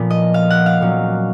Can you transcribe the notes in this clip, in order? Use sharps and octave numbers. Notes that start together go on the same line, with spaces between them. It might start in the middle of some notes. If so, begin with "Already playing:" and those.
Already playing: A#2 F3 B3
D#5
F5
F#5
F5
A#2 F#3 C#4